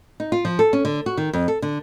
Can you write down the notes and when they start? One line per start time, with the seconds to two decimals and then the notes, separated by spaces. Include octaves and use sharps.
0.20 D#4
0.32 F4
0.45 F3
0.59 A4
0.73 C#4
0.85 D3
1.06 F#4
1.17 D#3
1.33 F2
1.48 A4
1.62 D3